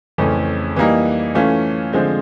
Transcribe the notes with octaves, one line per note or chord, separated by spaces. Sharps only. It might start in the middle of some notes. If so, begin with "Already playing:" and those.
F2 C#3 E3 A3 C#4
E3 G3 A#3 D#4
E3 A3 C#4 F4
D3 F3 G#3 C4